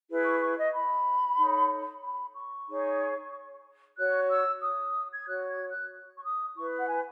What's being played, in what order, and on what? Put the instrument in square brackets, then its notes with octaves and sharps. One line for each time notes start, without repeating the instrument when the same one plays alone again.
[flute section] E4 G#4 B4
C#6
C#6
D#5
B5
D#4 A4 C#5
B5
C#6
D#4 G#4 C#5
F#4 C#5 F#6
E6
D#6
G#6
F#4 C#5 F#6
G#6
F#6
C#6
D#6
E4 B4 C#6
F#5
G#5